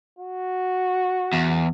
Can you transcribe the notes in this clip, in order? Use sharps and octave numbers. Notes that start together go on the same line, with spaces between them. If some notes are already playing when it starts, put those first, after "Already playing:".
F#4
E2